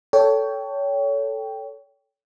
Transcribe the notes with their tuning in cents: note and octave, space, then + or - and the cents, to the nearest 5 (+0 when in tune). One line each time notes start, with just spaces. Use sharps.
A4 +0 C#5 +25 G5 +0